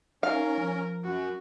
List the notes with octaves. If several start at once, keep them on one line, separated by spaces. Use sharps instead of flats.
C#4 D#4 A#4 F5
F3
F#2 F#4